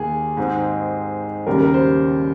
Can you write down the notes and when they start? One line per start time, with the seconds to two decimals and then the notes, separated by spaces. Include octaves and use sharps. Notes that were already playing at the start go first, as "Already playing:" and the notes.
Already playing: D#2 D#3 A#3 G#4
0.37 G#2 D#3 G#3 C4 D#4
1.47 D#2 C#3 G3 A#4
1.61 A#4
1.74 C5